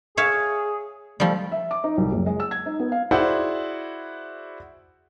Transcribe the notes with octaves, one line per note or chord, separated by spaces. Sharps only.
G#4 C#5 E5 F5
F3 G3 A3
E5
D6
D#4
C2
F#1
G#3
E6
G#6
D#4
B3
F5
E4 F#4 G#4 C5 D5 F#5